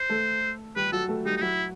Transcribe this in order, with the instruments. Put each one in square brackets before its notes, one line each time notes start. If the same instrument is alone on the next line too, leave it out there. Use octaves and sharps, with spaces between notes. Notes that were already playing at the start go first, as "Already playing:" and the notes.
Already playing: [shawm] C5
[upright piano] A3 A4
[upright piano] G3 G4 [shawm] B4
[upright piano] F#3 F#4 [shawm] A4
[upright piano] A3 A4
[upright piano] G3 G4 [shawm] D#4
[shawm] D#4
[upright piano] F#3 F#4 [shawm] E4